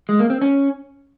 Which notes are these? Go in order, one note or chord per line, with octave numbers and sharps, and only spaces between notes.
G#3
A#3
C4
C#4